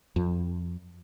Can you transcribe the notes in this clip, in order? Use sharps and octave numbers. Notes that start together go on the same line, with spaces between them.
F2